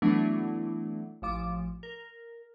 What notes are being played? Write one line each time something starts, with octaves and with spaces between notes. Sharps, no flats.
E3 F#3 A3 B3 D4 E4
A1 F3 D6
A#4